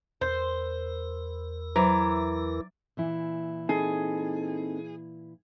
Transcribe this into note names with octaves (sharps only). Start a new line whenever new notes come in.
E2 A#4 C5
E3 F#3 C5 D5 A#5
A#2 E3 E4
C4 D#4 G#4 A4